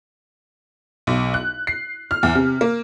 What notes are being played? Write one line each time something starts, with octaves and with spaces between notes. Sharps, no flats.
B1
F#6
C7
F6
E2
C3
A#3